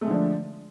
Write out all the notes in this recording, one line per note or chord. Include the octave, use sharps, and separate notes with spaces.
D3 F3 G#3 A3 D4